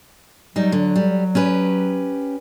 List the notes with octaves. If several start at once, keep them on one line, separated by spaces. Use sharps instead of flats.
F#3 G3 D#4
D3
G3
C#4 G4 B4